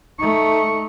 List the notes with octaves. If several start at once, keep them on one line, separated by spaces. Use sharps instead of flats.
A3 D#4 C#6